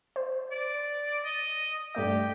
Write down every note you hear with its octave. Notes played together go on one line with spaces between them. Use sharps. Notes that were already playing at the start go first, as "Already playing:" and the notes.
C5
D5
D#5
G2 A3 G4 D5